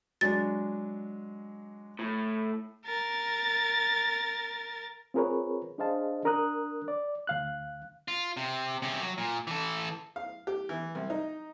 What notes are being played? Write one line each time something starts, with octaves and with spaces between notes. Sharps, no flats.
F#3 G#3 D4 A6
A2
A#4 A6
C4 F4 G#4 A#4 B4 C#5
D4 G#4 C5 D#5 F5 A5
D4 A#4 A#5 D#6 F#6
D5
D2 F5 F#6
F4
C3
C3 C#4
F#3
A#2
E3 A4
F5
G4
E3
C2
D#4